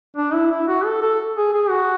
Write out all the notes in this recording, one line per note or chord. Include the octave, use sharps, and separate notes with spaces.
D4
E4
E4
F#4
A4
A4
G#4
G#4
F#4